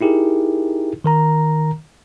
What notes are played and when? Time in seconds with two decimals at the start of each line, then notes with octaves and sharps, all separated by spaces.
0.01 D#4 E4 G4 G#4 A#4
1.04 D#3 A#4 A#5